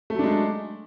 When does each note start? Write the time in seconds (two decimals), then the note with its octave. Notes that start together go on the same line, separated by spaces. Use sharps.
0.10 A3
0.15 F#3
0.19 D4
0.24 G#3